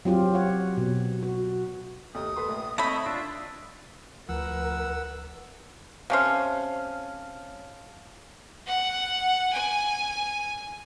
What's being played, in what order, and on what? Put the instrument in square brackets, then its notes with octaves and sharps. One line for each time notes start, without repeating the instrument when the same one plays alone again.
[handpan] F#3 C4 F4 G4
C#5 F#5
B2
F#4
[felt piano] D#2 A3 D#4 [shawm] D#6
[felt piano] A4 B4 C6
A#1
[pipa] A3 B5 [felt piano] C4 [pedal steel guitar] C#5 D#5 [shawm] E5
[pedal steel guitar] D4 F4 [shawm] E5 [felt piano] D7
[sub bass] D2 [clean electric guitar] F3 [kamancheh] A#4 B4 [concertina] F#5 E6
[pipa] C3 C#4 C5 [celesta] F5 A5 F6
[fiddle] F#5
G#5